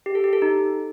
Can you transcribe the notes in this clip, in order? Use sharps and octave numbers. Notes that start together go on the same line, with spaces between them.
G4
A4
G4
A4
D#4